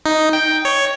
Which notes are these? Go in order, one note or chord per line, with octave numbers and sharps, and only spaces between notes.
D#4
G5
C#5